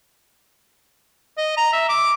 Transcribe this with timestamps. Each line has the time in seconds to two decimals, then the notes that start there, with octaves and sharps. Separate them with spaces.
1.38 D#5
1.57 A#5
1.73 E5
1.89 D6